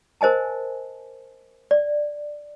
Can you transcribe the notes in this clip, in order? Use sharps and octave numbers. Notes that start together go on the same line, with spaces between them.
A#4 C5 D#5 G#5 A5
D5